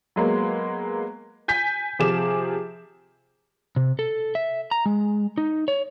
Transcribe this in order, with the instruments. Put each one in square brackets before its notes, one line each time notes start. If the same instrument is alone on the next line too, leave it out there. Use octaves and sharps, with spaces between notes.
[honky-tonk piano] F#3 G#3 A#3 B3
G#5 G6 B6
C3 F3 G#4 D6 E7
[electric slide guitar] C3
A4
E5
A#5
G#3
D#4
C#5